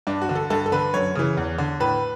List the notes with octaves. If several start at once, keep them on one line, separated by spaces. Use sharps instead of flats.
G2 D4
F#4
D3
A4
G2 A4
A4
D3 B4
F#2 C#5
C#3 E3
E2
D3
A2 B4